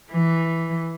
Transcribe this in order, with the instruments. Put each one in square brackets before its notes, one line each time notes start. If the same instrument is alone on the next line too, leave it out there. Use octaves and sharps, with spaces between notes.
[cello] E3